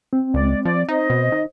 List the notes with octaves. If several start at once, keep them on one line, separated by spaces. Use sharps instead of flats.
C4
C#2 G#3 D5
F3 D5
D#4 C5 D#5
B2
D#3